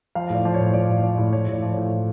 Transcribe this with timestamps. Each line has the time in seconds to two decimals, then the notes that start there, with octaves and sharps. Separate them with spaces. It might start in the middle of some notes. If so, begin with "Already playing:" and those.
0.15 F3 F5
0.30 A2 D5
0.45 F3
0.54 C#5
0.60 A2
0.73 F3 D5
0.89 A2
1.03 F3 D5
1.18 A2
1.33 F3 C#5
1.47 A2
1.53 D5
1.62 F3
1.72 A2 C#5
1.91 F3